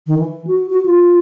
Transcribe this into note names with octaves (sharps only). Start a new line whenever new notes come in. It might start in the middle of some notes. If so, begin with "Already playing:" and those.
D#3
E3
F#4
F#4
F4